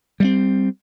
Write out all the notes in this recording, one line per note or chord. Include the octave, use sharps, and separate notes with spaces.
G3 G#3 C4